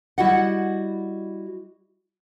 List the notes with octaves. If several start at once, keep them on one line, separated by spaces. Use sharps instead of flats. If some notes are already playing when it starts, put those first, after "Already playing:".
G3 E4 F#4 D#5 F#5